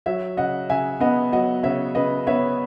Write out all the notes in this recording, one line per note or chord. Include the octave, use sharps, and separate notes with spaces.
F#3 C#5 E5
C#3 D#5 F#5
C#3 E5 G#5
B3 D#5 F#5
F#3 D#5 F#5
C#3 C#5 E5
C#3 B4 D#5
B3 C#5 E5